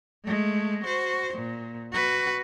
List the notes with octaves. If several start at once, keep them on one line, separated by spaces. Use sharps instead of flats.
G#3 A3
F#4 C5
A#2
F#4 B4